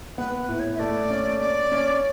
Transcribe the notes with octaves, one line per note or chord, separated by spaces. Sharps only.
B3 B4
B4
A2
C#5
E5
A3 D5
C#4
C#4 D5
C#4